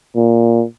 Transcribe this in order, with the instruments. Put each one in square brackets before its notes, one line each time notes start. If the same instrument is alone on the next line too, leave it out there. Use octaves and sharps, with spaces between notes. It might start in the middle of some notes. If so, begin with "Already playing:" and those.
[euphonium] A#2